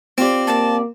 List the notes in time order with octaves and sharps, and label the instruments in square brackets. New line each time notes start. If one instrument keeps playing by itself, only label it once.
[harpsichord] C4 [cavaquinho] F4 G4 D5
[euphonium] A#3 [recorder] A5